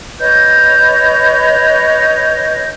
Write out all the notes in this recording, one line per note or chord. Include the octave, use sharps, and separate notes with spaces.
B4 C#5 D#5 G6